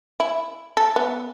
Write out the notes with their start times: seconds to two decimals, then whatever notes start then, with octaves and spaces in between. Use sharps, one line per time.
0.20 E4
0.77 A4
0.96 B3